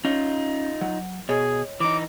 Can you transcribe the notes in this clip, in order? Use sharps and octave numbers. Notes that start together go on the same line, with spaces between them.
C#4 D#4 F4
F#3
B2 G#4 C#5 D#5
E3 D#4 D6